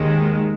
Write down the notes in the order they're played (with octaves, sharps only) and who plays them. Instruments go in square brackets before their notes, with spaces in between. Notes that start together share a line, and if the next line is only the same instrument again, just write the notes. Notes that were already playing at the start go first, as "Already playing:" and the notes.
Already playing: [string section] D#2 D#3 G#3